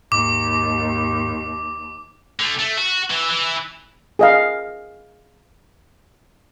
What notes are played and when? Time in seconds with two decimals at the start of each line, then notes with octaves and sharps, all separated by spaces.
0.12 D#2 G#2 D6
2.39 D3 A3
2.59 A3
2.78 F#4
3.10 E3
3.30 E3
4.19 G#4 D#5 F5